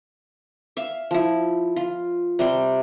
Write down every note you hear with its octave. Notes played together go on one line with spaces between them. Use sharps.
E5 F5
F3 E4
F4
C3 G3 C6